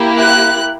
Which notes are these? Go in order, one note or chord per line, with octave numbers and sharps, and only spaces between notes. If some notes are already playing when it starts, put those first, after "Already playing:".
Already playing: A#3 E4 G4
F#6